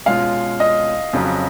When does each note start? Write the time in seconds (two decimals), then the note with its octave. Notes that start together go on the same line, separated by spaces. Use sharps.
0.06 B2 G#3 C#4 F4 F5
0.60 D#5
1.13 F2 C#3 F#3